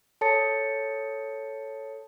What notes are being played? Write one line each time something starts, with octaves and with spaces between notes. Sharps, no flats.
A4 C#5 A5 A6 C#7